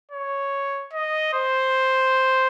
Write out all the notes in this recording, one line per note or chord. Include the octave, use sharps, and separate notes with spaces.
C#5
D#5
C5